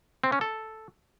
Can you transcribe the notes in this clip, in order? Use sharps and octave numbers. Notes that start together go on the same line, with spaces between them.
C4
C#4
A4